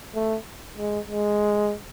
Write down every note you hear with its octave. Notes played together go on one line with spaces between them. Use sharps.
A3
G#3
G#3